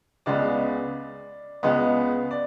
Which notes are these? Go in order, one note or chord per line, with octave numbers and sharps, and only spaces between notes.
C#2 C#3 G#3 B3 D5
C#2 C#3 G#3 B3
D5